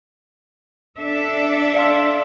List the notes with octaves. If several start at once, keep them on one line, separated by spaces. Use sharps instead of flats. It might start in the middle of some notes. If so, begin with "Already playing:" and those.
D4 A4 E5
D5 F5 C6